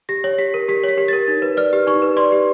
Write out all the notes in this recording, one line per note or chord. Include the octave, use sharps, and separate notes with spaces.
G4 A#6
C#5
G4 B6
A#4
G4 B6
C#5 B6
G4
A#4 A6
D#4
B4
D5 F6
G4
D#4 C#6
B4
D5 C6
G4